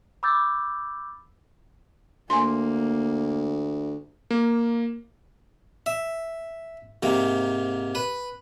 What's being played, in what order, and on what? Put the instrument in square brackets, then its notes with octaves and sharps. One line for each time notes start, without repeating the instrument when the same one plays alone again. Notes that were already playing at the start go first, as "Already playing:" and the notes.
[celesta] B5 D6 E6 G6 A6
[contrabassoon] D2 [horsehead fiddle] A#3 [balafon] G#5 C6
[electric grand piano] A#3
[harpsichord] E5
G#2 C3 A#3
B4